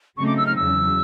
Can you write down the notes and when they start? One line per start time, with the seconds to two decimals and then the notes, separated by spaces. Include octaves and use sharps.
0.17 C#3 F#3 A3 C4 D#4 C#6
0.27 D6
0.37 E6
0.47 F6
0.55 E2 C#3 F#3 E6